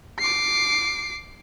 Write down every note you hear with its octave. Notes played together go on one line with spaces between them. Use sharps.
D6 C7